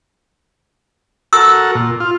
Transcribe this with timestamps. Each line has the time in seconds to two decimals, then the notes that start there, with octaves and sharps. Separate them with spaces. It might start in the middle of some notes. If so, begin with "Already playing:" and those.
1.33 F#4 A4 A#4 E6
1.75 A#2
2.00 F4